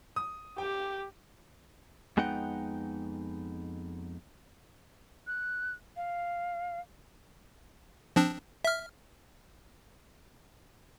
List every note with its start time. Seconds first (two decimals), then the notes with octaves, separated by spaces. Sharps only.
0.16 D#6
0.58 G4 G5
2.17 F2 G#3 B3 D#4 F#5 G5
5.27 F#6
5.97 F5
8.16 F3 C4 D4
8.64 E5 F6